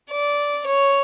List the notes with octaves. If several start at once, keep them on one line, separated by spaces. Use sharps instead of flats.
D5
C#5